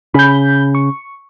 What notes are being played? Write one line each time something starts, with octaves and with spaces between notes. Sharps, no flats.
C#3 B5 G6
C#6